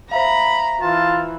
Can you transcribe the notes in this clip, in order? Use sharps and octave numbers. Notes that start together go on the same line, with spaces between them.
C5 E5 F5 A#5 B5
E3 F4 A5